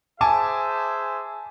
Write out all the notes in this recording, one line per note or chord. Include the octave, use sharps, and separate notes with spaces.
G#4 C5 E5 G#5 A5 D6